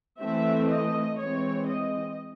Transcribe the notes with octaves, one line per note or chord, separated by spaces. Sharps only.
E3 A3 C4 E5
D#5
E3 G#3 C4 C#5
D#5